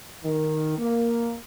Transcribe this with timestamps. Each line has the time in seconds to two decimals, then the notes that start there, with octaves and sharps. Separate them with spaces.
0.24 D#3
0.78 A#3